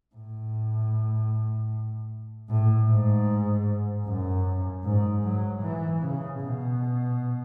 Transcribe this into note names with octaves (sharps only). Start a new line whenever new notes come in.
A2
A2
G#2
F#2
G#2
F#3
E3
C#3
B2